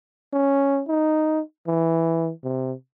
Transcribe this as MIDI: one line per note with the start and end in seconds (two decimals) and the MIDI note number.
0.33 0.82 61
0.88 1.41 63
1.67 2.31 52
2.44 2.73 48